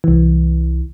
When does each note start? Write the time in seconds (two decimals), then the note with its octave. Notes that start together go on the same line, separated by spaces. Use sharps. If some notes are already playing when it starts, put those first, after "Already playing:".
0.04 C2 E3